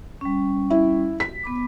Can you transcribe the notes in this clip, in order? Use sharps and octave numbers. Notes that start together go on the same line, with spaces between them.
G3 C#4
E4
B6
B3 B5 D6